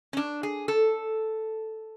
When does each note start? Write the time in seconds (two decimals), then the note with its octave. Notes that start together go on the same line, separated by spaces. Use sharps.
0.13 C#4
0.17 D4
0.43 G#4
0.68 A4